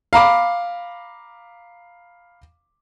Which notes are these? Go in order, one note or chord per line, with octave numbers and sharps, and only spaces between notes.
F5 A#5 B5 D6